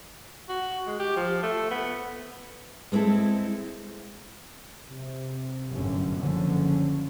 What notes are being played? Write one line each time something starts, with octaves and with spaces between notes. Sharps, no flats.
F#4
G#3
G4
F3
A3
B3
G#3 B3 C4 E4 A4
C3
G1 F#2 A2 D3 C#4
F#1 D3 F3 C#4